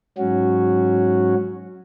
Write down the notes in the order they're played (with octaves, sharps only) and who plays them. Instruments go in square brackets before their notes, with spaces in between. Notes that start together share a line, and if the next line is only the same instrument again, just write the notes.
[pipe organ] G#2 F#3 C#4 F#4